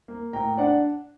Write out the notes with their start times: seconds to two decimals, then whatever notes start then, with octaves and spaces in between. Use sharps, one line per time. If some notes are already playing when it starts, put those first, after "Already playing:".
0.08 A#3
0.33 A2 G5 A#5
0.58 D4 D5 F#5